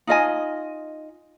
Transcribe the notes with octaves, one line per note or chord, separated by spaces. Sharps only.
D#4 F4 D#5 G#5